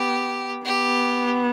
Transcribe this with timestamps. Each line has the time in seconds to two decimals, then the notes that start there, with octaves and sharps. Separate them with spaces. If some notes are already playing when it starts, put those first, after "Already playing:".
Already playing: B3 G4
0.66 B3 G4